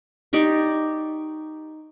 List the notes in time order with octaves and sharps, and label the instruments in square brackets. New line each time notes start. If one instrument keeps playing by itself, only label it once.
[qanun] D#4 G4 D5 C#6